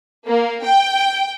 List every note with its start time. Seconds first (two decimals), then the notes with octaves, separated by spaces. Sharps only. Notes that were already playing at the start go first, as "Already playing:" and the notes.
0.25 A#3
0.63 G5